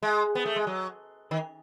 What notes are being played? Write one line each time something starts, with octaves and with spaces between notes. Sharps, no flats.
G#3
B3
A3
G#3
F#3
D#3